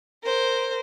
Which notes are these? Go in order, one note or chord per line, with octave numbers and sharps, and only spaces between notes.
A#4 C5